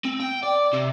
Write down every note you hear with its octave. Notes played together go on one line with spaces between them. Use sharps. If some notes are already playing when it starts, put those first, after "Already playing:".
C4
G5
D5
C3